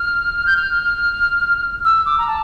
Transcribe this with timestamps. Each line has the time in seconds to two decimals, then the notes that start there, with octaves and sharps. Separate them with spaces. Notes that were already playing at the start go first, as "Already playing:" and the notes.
Already playing: F6
0.46 G6
0.57 F6
1.85 E6
2.06 D6
2.18 A#5
2.28 A5